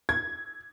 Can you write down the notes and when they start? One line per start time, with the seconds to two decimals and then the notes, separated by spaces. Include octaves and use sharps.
0.09 G#6